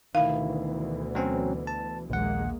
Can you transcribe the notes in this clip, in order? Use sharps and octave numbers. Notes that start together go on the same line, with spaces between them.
D2 B2 D#3 E3 E4 F5
F#3 C4 C#4
A5
A#1 D#2 G#3 A#3 F#5